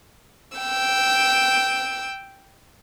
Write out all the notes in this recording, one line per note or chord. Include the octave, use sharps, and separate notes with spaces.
G5 E6